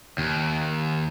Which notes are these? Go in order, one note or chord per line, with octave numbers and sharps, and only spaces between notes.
D#2